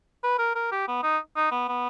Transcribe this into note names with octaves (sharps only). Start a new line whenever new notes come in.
B4
A#4
A#4
G4
B3
D#4
D#4
B3
B3